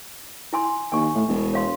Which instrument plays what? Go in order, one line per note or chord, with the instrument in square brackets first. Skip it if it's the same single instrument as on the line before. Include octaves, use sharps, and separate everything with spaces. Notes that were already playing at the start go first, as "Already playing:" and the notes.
[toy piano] E4 G#5 C6
[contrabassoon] D#2 [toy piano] G#5 C#6
[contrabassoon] A2
E1
[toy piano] C#5 F5 C6